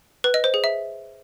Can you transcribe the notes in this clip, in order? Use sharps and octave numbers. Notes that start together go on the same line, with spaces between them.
B4
D#5
C5
G#4
E5